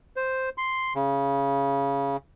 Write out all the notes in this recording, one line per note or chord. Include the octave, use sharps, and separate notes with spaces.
C5
C6
C#3